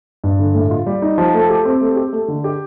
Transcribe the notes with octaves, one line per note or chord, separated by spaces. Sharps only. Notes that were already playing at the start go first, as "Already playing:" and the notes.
G2
D3
A2
F4
G3
D#4
F3
A3
G4
C4
A3
G4
A3
D3
G4